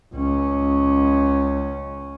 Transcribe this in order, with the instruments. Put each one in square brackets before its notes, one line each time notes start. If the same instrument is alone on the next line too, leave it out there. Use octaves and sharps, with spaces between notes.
[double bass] C#2 C#4